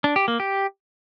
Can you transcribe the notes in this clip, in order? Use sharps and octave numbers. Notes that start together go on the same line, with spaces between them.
D4
G4
A#3
G4